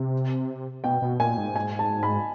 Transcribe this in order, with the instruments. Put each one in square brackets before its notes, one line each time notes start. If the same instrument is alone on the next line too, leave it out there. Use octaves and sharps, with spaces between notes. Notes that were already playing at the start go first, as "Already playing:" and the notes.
Already playing: [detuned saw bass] C3
[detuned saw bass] B2 [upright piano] G5
[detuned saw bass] B2
[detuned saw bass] A#2 [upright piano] G#5
[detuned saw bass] G#2
[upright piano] G#5
A5
B5